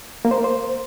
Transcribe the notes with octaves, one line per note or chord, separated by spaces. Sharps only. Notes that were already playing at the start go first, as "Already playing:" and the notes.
A#3
C5
A#4
C5